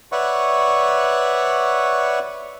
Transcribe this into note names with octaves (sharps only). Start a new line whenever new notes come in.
B4 C#5 D5 E5 F#5 C#6